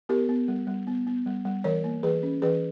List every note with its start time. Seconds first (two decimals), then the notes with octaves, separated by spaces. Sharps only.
0.09 B3 G4 A#4
0.29 B3
0.48 G3
0.67 G3
0.87 B3
1.07 B3
1.26 G3
1.45 G3
1.64 E3 A#4 C#5
1.84 A#3
2.03 E3 G#4 B4
2.23 C#4
2.42 E3 G#4 B4